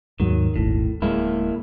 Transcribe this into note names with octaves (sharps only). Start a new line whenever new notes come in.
D#2 G#2 D#3 F#3
D#1 G#1 A2
D1 G#3 A#3 E4